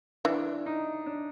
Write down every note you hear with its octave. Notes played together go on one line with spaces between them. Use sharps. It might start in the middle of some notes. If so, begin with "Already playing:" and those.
E3 D4
D#4
D4